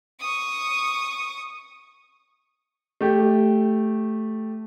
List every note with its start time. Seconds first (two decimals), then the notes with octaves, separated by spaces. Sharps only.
0.20 C#6 D#6
3.01 A3 G4